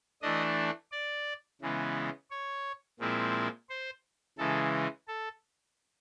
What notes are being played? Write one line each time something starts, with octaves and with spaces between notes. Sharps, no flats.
E3 A3 D4 D#5
D5
C#3 E3 G#3 B3
C#5
A#2 F3 G#3 C4 E4
C5
C#3 E3 G#3 A4
A4